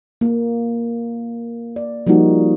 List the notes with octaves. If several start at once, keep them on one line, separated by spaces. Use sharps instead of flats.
A#3
D5
F3 G3 A#3 D#4 F#4